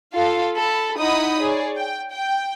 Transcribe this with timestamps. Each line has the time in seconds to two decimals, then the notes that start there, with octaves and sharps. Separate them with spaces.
0.14 F4 A4 F5
0.56 A4 B5
0.99 D#4 E4 D#5 F#5 B5 D#6
1.41 G#4 C#5 D5
1.75 G5
2.11 G5